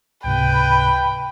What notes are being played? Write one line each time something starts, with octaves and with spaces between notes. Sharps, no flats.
C#2 G#2 C3 B4 G5